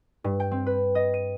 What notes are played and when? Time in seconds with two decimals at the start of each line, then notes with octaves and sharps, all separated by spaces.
0.24 G2
0.40 G5
0.51 C4
0.66 B4
0.95 D#5
1.14 D#7